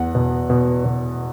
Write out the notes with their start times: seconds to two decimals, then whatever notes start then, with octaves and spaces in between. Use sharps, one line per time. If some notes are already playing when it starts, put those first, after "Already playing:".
Already playing: E2 F#5
0.15 B2
0.50 B2
0.85 B2